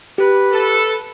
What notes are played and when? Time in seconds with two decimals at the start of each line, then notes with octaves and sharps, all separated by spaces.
0.18 G4 B4
0.52 A4